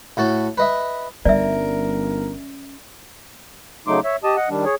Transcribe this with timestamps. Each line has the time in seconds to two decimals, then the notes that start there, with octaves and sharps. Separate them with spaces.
0.17 A2 F#4 A4 A5
0.58 B4 D#5 E5
1.25 G1 G3 C#4 A#4 D5 E5
3.87 C#3 F#3 A3 D#4 C6 D6
4.04 C#5 E5
4.24 G4 D#5 A5 D#6
4.36 D#5 F#5
4.50 D#3 G3 D4
4.65 G#4 C#5